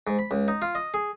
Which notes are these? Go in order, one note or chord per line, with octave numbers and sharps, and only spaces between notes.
G#2
B5
C#2
D#4
F4
D#5
G#4